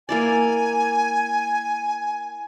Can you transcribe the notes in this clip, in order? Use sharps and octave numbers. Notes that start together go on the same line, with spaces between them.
A#3 E4 D5 G#5